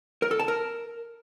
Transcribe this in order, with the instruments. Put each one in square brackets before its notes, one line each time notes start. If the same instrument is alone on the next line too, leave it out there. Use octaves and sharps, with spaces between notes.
[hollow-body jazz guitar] A#4
A4
A5
A#4